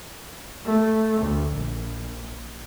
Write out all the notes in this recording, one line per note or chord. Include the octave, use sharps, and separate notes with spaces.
A3
D2
A#1